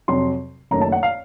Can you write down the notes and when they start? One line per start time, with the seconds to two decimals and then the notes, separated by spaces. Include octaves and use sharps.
0.08 F2 C3 F#3 C6
0.71 F#1 F#2 D#3 A3 A#5
0.81 A5
0.92 F#5
1.03 F5